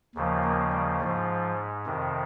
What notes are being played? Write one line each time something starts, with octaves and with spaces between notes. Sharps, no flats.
D#2 C#3 F3
A#3
G3
G#2 F3
F2 C3 D#3